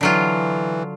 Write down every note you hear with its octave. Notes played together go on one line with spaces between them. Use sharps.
D3 E3 F#3 F4